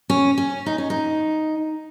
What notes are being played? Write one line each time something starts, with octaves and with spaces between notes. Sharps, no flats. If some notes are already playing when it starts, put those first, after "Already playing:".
C#4
C#4
D#4
C#4
D#4